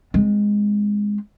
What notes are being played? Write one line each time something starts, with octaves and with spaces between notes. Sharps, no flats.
G#3 C4